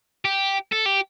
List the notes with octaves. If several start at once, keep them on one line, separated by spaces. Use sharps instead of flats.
G4
A4
G4